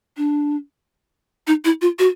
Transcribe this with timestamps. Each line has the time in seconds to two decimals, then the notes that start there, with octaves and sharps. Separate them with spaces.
0.17 D4
1.47 D#4
1.65 E4
1.82 F4
1.99 F#4